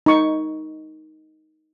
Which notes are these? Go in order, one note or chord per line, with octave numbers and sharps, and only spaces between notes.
D#4 C#6